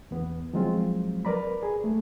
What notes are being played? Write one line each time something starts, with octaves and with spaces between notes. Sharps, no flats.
E2 B3
F3 F#3 G#3 C4 F4
A#4 B4 D5 A#5 B5
G#4
A3